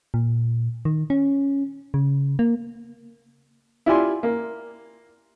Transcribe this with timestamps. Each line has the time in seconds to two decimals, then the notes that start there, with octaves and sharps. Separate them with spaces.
0.14 A#2
0.85 D#3
1.10 C#4
1.94 C#3
2.39 A#3
3.86 E4 F4 G4 D5 G#5 C6
4.23 A#3